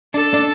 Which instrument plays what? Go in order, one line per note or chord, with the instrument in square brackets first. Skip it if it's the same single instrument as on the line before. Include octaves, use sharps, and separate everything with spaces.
[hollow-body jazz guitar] D4 [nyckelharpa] A4
[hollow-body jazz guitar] D4